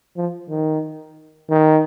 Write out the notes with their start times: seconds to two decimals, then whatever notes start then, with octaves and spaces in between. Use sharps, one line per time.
0.17 F3
0.49 D#3
1.50 D#3